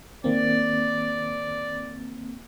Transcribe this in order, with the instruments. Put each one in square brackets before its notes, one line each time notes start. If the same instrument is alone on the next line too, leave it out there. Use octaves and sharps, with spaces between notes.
[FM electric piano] D#3 A#3 C4 [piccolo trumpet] D5